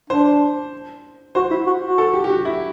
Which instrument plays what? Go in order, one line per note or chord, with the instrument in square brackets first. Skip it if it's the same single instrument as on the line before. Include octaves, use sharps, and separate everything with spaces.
[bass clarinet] D4 [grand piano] C5
[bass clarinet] F#4 [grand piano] C5
[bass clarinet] E4
F#4
F#4
[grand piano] A4
G4
G4
F#4
E4